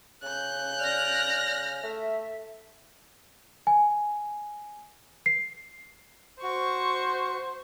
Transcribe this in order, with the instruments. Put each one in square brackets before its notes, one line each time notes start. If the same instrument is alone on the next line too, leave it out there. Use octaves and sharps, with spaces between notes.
[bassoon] C#3 [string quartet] F#6 G6
[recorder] D5 [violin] F6 A#6
[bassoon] A3 [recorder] E5
[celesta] G#5
C7
[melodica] F#4 [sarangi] C5 [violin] C#6